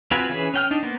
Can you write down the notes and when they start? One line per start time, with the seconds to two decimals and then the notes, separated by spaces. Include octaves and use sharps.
0.11 C4 F4 F#4 B4 G#5
0.29 E3 C#4 G#4 B4
0.54 C#4 G5 F6
0.71 D4 D#4
0.83 A#3 B3 C5